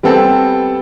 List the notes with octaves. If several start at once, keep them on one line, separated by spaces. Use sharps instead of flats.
G3 B3 C4 A4